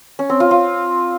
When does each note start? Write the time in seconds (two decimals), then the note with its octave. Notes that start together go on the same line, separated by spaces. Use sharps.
0.19 C#4
0.30 C4
0.40 F4
0.51 F4